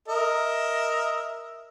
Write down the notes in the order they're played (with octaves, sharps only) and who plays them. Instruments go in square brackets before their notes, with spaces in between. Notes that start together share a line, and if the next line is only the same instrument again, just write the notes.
[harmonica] A#4 D#5 E5